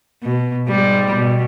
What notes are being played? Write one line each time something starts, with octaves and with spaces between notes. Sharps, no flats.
B2
G#2 G3
B2